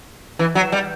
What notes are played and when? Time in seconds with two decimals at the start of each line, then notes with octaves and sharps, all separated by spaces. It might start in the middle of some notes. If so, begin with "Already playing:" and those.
0.39 E3
0.55 F#3
0.72 G3